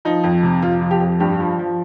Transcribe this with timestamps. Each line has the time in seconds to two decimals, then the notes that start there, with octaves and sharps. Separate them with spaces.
0.05 F3 D#4
0.24 F2
0.43 C3
0.62 F2 F4
0.81 F3
0.91 G4
1.01 F2
1.20 G2 G4
1.40 F3
1.59 F3